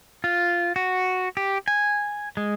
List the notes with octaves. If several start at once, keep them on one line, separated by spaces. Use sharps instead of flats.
F4
F#4
G4
G#5
G#3